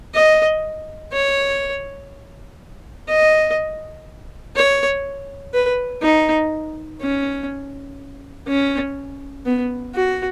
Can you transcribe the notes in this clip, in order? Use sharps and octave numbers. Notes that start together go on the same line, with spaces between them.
D#5
C#5
D#5
C#5
B4
D#4
C#4
C#4
B3
F#4